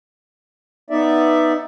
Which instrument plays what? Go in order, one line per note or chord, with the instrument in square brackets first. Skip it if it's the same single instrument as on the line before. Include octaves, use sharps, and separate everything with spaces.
[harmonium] B3 D#4 D5 E5